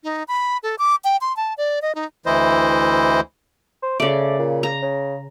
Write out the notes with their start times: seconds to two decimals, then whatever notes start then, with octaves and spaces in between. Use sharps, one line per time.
0.04 D#4
0.28 B5
0.63 A4
0.79 D6
1.04 G5
1.21 C6
1.37 A5
1.58 D5
1.82 D#5
1.95 D#4
2.26 D2 E3 E4 C5 D#5
3.82 C5
4.00 C#3 A3 D5
4.39 A#2
4.63 A#5
4.82 C#3